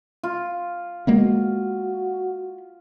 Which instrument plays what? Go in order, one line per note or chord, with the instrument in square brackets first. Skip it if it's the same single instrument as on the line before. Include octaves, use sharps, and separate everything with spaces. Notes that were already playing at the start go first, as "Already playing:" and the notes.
[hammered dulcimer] F4
[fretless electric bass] G#3 A#3 B3 [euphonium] F#4